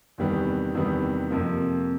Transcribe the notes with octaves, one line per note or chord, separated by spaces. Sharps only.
E2 C3 D#3 G3 B3
E2 C3 D#3 G3 B3
F2 C3 F3 A#3